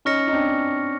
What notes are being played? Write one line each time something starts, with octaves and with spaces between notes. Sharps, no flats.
C#4 D#4 C#6 F6 A#6 C#7
D#4
C4 D4